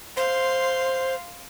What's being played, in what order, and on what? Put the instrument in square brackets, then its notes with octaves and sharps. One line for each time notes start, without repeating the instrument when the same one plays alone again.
[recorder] C5 [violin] F5 C6